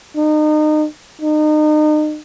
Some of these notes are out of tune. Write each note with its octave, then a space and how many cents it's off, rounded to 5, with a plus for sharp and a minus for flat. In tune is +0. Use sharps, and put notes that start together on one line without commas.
D#4 -30
D#4 -35